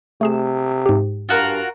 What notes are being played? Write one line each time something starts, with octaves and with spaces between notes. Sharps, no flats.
C3 A3 G#4 E7
G#2 G4
G2 F4 F#4 A#4